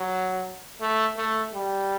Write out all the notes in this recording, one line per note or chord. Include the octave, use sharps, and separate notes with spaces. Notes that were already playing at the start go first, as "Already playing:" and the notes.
Already playing: F#3
A3
A3
G3